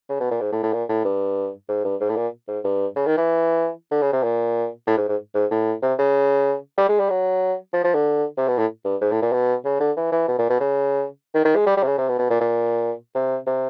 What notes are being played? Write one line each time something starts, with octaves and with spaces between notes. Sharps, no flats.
C#3
B2
A#2
G#2
A2
A2
A#2
A2
G2
G#2
G2
G#2
A2
A#2
G#2
G2
C#3
D#3
E3
D3
C#3
C3
A#2
A2
G#2
G#2
G#2
A2
C3
C#3
G3
G#3
G3
F#3
F3
F3
D3
C3
B2
A2
G2
G#2
A2
A#2
B2
C#3
D3
E3
E3
B2
A#2
B2
C#3
D#3
D#3
G#3
G3
G3
C3
C#3
C3
B2
B2
A#2
A#2
C3
C3